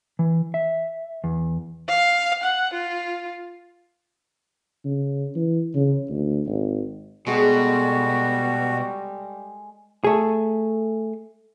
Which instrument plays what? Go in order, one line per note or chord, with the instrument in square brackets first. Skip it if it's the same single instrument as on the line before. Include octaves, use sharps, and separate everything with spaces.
[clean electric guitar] E3
E5
E2
[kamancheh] F5
F#5
F4
[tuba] C#3
E3
C#3
D2
G#1
[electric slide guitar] B2 [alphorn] G3 [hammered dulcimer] G#3 A4 [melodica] F#4
[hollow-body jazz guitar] A3 G#4